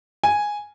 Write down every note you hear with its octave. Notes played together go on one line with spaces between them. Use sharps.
G#5